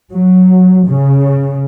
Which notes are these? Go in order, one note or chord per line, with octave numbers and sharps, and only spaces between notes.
F#3
C#3